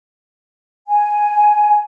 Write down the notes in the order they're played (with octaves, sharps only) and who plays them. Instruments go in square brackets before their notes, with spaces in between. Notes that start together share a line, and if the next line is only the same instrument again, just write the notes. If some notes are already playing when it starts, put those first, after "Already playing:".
[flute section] G#5